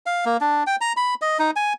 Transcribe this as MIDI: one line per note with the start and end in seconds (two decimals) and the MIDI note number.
0.06 0.25 77
0.25 0.37 58
0.41 0.63 62
0.67 0.76 79
0.81 0.93 82
0.97 1.14 83
1.22 1.38 75
1.39 1.51 63
1.56 1.73 80